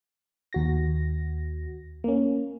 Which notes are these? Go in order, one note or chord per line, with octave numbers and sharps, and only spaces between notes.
D#2 F#4 A#6
A#3 C#4